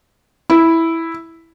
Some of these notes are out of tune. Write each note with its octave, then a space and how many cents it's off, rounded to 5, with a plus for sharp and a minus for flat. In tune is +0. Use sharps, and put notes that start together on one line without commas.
E4 -5